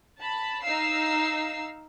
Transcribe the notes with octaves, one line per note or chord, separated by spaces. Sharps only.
A5 B5
D#4 F5 E6 C7